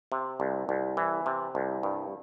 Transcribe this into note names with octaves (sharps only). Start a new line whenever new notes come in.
C3
C2
C2
E3
C3
C2
G2